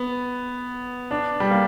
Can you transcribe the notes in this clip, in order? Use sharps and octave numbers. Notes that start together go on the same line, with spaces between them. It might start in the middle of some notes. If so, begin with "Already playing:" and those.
Already playing: B3
D4
G3
A#3